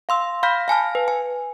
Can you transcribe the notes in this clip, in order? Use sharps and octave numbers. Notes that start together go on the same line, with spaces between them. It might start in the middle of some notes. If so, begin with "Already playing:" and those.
F5 C6 E6
F5 B5 F6 G6 B6
F5 G#5 A5 F6
B4
G#5